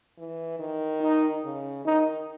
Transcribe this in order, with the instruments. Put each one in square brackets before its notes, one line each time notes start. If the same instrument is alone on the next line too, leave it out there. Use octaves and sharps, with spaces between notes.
[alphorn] E3
D#3
[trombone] D#4
[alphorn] C#3
[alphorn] D#3 [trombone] D#4